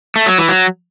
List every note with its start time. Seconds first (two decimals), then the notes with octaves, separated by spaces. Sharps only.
0.16 A3
0.26 F#3
0.38 E3
0.49 F#3